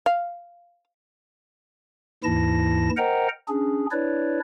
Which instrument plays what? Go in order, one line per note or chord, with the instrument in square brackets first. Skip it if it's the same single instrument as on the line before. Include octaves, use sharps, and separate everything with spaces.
[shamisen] F5
[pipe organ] D#2 G#2 E3 E4 A5 A#6
A#4 C5 D#5 F#5 G5 A#5
C#4 D4 G#4
D4 E4 B4 C#5 D5